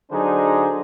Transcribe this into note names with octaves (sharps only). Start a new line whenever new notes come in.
D3 F#3 D4 D#4 G#4 C5